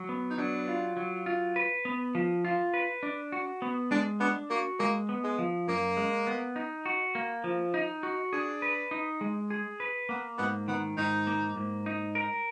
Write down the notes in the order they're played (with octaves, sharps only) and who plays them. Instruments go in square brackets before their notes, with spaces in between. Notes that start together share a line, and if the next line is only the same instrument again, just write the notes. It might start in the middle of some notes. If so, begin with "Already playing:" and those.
Already playing: [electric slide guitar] F#3
B3
[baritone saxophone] D#4
[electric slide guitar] F#3 [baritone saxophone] D4
[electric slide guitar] F4
F#3
F4
B4
B3
F3
F4
B4
D4
F#4
B3
[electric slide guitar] G#3 [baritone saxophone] D4
[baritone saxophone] B3 [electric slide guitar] D4
[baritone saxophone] A#3 [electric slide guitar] F#4
[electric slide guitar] G#3 [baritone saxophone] A#3
[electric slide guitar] B3
[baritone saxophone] G#3
[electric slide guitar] F3
[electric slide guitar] F#2 [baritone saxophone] A#3
[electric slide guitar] G#3
B3
D#4
F#4
A#3
F3
D#4
F#4
[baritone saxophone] D4 [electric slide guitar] G#4
[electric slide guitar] B4
D#4
G#3
G#4
B4
[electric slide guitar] A#3 [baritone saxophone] B3
[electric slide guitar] G#2 [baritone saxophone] B3
[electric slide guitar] D#3 [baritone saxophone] B3
[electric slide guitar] G#2 [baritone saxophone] D#4
[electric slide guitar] A#3
G#2
D#4
A#4